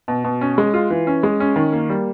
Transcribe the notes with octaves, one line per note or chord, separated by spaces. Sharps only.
B2
B2
C#4
G#3
F4
E3
C#4
G#3
C#4
D#3
A#3
G3